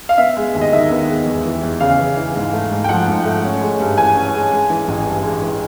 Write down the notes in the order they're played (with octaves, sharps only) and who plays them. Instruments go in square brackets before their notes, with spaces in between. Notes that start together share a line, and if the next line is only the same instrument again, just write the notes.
[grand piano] F5
B3 E5
G#3
D#2
D#5
D#3 E5
B3
G#3
E2
E3
E2
C#3 F5
E2
E3
G#2
A3
G#2
G5
F3 F#5
G#2
A3
C#4
G#3
G2
E3 G#5
C#4
G#3
G#3
E3
A1
G2
G#3
E3